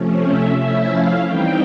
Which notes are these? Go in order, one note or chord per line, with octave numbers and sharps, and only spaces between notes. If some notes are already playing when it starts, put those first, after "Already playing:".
Already playing: C3 F3 A3 C#4
E5
F3 A3 C#4 E4 E5
F5
E3 G3 C4 D#4 G5